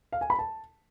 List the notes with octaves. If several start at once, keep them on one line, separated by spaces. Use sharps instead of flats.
F5
G#5
B5
A5